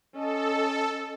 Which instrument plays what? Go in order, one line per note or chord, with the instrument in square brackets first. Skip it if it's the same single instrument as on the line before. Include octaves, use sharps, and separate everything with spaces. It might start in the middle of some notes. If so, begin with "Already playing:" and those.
[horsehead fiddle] C#4 D#5 [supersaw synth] A4